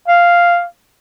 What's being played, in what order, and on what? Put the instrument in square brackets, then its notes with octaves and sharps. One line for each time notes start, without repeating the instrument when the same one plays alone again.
[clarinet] F5